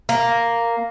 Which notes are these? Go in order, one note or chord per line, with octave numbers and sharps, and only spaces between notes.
A#3